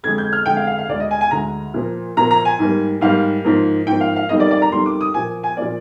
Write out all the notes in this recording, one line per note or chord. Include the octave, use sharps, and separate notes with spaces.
F2 D3 G#3 G#6
G6
F6
F2 D3 G#3 G5
F5
F5
F5
D2 D3 G#3 D5
D#5
G#5
G#5
D2 D3 G#3 A#5
A#2 F3 A#3
A#2 F3 A#3 A#5
A#5
G#5
G#2 G3 A#3
G#2 G3 A#3 F5
G#2 F3 A#3
G#2 F3 A#3 G5
F5
F5
F2 D#3 G3 A#3 D#5
D5
D5
A#5
F2 D#3 G3 A#3 C6
D6
D#6
A#2 F3 A#3 G#5
G#5
A#2 F3 A#3 D5